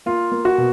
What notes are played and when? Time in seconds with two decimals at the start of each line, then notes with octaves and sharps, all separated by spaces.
0.06 A#3 F4
0.32 A#3
0.45 F#4
0.58 B2